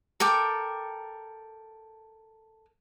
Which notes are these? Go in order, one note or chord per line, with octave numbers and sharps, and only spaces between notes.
A4 A#4 G5 D6